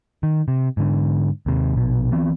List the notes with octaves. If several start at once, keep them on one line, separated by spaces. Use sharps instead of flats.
D#3
C3
G#2 D3
D#2 C3
A#1 B2
E3 B3 C4